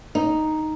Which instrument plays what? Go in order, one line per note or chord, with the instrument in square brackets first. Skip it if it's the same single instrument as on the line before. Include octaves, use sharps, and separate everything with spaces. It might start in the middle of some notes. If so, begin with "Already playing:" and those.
[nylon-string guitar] D#4